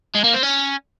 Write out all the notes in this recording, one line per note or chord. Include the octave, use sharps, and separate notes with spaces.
G#3
A#3
C4
C#4